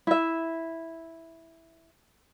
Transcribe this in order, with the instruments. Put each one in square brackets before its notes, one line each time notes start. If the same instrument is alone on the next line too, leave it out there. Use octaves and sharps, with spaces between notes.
[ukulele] E4 E5